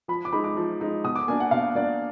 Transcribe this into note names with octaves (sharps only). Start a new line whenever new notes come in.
F3 B5
D6
G#3 D#4 B5
D6
F3
G#3 D#4
B2 D#6
D6
A#3 D4 G#5
F#5
B2 F5
A#3 D4 D5